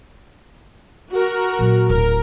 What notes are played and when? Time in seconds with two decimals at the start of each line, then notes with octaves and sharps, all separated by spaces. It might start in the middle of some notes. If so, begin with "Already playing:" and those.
1.13 F#4 A#4
1.59 A#2 F#3
1.90 D1 A2 A#4